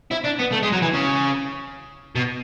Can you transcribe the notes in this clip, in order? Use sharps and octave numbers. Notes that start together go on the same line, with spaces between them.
E4
D4
B3
A3
G#3
F#3
E3
C#3
B2